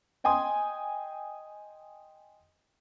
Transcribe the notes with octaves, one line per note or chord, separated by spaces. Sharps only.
D#5 G5 G#5 C6 D#6